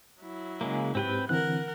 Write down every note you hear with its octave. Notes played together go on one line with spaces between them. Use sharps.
F#3 E4
C#3 G#3 A#3
G#2 C4 G4 B4 G5
D3 E3 C4 A#4 F#5 F#6